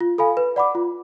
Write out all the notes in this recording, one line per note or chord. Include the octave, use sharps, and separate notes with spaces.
F4
A4 F5 G#5 B5
B4
D5 F#5 B5 D6
F4